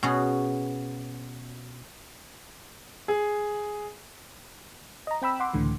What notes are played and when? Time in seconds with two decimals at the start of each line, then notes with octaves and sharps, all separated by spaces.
0.03 B2 C#4 F#4 G#4
3.08 G#4
5.07 D#5 A#5
5.22 C4 G5 B5 E6
5.40 F#5 C6 D6
5.53 C#2 A2 D3 E3